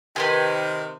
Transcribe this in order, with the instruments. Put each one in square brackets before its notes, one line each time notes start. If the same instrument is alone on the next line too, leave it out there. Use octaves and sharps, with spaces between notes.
[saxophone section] C3 D#3 [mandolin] B4 C5 G#5